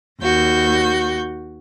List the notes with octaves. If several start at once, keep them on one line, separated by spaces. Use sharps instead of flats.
D#2 F#4 G6